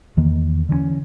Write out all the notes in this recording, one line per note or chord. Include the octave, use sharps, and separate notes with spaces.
E2 D#3 E3 A#3
D3 E3 B3 C#4